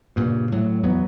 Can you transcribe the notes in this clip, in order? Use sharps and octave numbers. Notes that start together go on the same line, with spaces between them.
G2 A#2 C#3
A2 F#3
E2 F#3 B3